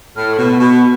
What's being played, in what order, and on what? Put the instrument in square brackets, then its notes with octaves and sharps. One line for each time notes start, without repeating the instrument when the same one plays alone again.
[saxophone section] A2 [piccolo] F6
[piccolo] B5
[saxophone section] B2 [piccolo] C#6
[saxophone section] B2 [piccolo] C#6